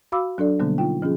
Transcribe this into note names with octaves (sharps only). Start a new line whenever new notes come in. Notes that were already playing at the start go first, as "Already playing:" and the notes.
F#4 F5 B5 D6 E6
F#3 D4 A4 D5
B2 D3 F#3 G3 A#3 B3
D#4 F4 G5
F3 C#4 F4 G#4